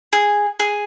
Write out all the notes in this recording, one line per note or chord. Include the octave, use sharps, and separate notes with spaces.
G#4
G#4